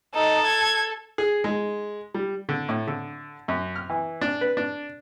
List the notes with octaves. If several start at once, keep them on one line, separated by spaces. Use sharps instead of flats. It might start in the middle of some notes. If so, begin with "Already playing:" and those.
D#4 A4
G#6
G#4
G#3
G3
D3
A2
D3
F#2
F6
E3
D4
B4
D4